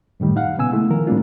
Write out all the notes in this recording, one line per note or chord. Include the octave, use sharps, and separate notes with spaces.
F#2 A2 D#3 G3
D#4 F5 F#5
A#2 C#3 B3 G#5 E6
G#3 A3 E4
D#3 F3 A#4
A2 G3 A#3 C4 D4 F4